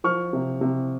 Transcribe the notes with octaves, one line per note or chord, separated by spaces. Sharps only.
F3 C#6 F6
C3
C3